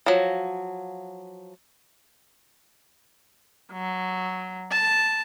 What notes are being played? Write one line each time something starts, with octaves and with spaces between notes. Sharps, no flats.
F3 F#3
F#3
A5